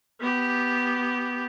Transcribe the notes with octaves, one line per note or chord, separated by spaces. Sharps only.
B3 G4